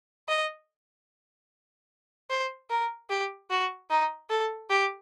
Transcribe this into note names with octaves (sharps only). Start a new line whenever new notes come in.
D#5
C5
A#4
G4
F#4
D#4
A4
G4